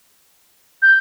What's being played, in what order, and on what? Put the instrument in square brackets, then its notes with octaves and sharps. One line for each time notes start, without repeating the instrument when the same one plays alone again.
[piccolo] G6